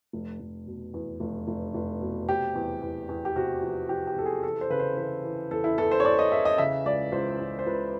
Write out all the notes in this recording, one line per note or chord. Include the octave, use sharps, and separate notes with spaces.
F1
F1
B2
E2
F1
F1
F1
B2
C3 G4
E2
E2
E2
G4
C3 F#4
F3
F3 G4
G4
C3 A4
G#4
E3 A4
C5
C#3 B4
C5
E3 B4
E3
E2 A4
E4
E2 A4
C5
C#5
E2 D5
D#5
E2 E5
D#5
C#3 E5
C#2 D5
C#2 C5
C#2
C5
C#2 B4